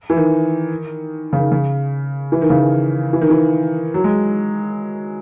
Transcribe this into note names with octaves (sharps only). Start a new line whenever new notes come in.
E3
D#3
C#3
D#3
C#3
E3
D#3
C#3
D#3
E3
D#3
E3
F#3
G#3